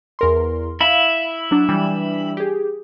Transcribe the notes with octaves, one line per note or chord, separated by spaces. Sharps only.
E2 A#4 C6
E4 F5 B5
F#3 D4
E3 G3 D4
G4 G#4